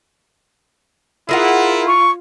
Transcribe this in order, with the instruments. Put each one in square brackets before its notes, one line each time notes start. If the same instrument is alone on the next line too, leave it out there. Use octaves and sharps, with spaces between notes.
[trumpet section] E4 [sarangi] F4 [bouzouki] G#4 A#4 F#5
[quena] C#6